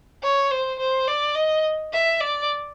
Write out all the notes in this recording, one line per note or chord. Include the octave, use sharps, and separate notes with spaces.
C#5
C5
C5
D5
D#5
E5
D5